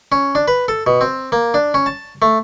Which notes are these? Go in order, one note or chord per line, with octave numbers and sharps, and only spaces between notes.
C#4
D4
B4
A4
B2
C4
A#3
D4
C#4
A5
A3